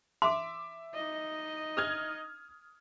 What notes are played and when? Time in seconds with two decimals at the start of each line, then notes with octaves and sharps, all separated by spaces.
0.22 E5 C6 D6
0.93 D#4 D#5
1.77 D#6 F6 G#6